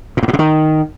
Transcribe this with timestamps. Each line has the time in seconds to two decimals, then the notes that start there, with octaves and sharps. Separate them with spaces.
0.17 A#2
0.23 G2
0.28 A2
0.33 C3
0.39 D#3